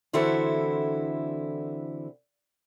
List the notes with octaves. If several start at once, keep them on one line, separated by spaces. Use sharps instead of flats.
D3 E3 C4 E4 F#4 A4